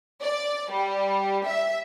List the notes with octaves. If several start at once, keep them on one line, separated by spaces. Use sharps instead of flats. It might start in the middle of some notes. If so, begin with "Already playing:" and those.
D5
G3
E5